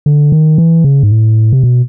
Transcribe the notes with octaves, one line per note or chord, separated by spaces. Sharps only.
D3
D#3
E3
C#3
G#2
A2
C3
B2